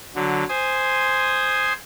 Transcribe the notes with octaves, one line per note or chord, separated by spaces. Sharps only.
D3 F#3
C5 G#5 C6 D#6